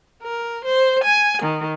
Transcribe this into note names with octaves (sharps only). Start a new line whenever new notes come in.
A#4
C5
G#5
D#3